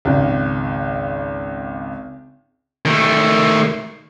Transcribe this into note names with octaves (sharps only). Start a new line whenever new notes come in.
G#1 C#2
D#3 A3